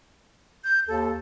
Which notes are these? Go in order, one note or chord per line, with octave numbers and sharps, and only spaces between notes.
G6
D#2 A4